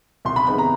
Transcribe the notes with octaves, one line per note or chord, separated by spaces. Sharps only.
C2 C6
B5
C3 D#3 G#3 B3 B5
A#5